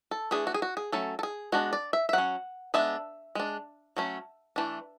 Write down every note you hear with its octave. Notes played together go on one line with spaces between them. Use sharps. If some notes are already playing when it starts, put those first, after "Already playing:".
A4
E3 A3 D4 G#4
F#4
G#4
F#4
G#4
F#3 A3 C#4 A4
A4
G#4
G#3 B3 D4 F#4
D5
E5
E5
F#3 C#4 F#5
G#3 B3 D4 E5
G#3 D4
F#3 A3 C#4
E3 A3 D4